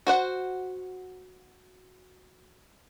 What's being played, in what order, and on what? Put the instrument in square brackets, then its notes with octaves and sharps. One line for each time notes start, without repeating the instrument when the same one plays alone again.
[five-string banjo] F#4 C5 F#5